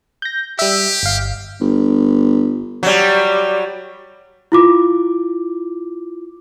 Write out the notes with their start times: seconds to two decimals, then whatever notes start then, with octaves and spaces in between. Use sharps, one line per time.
0.22 G6 A#6
0.59 G3 G4 E5
1.03 G1 F5
1.60 G1
2.83 F#3 G3
4.52 E4 F4 D6